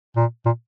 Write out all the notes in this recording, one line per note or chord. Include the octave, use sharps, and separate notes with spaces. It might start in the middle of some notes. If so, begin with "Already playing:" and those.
A#2
A#2